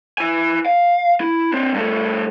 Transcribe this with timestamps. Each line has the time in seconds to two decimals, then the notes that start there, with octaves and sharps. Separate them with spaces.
0.18 E4 G#5
0.66 F5
1.21 E4
1.53 C4 D4
1.74 G2 A3